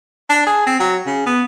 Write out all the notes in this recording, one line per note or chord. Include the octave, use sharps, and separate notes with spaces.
D4
G#4
C4
F#3
C#3
B3